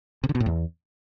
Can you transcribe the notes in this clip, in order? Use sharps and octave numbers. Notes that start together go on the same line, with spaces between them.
C3
D3
B2
A2
E2